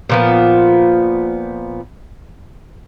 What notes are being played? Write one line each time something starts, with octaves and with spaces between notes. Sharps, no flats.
A#2 F3 B3